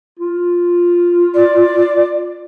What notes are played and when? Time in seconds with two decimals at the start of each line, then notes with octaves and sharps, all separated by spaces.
0.20 F4
1.34 D5